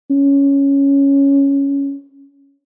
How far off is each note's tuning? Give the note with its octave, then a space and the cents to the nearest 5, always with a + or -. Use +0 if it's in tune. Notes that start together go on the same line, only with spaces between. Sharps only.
C#4 +5